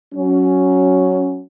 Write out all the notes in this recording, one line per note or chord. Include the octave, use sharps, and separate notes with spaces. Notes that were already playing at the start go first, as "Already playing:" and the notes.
F#3 C#4